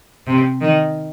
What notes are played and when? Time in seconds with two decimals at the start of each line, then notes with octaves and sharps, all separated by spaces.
0.27 C3
0.61 D#3